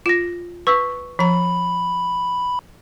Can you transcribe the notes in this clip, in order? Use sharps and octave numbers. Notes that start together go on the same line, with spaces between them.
F4 A#6 E7
B4 C#6 E6 B6
F3 A#5 B5